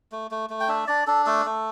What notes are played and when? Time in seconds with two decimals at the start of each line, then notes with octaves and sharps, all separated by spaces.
0.12 A3
0.31 A3
0.50 A3
0.60 G5
0.68 D4 E5
0.87 D4 D5
1.07 D4 A4
1.26 A3 A4
1.45 A3